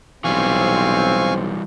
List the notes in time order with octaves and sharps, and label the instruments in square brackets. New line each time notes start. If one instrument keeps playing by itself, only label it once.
[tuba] B1 [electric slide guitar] E3 G3 [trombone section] C4 [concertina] F5 G#5 C#6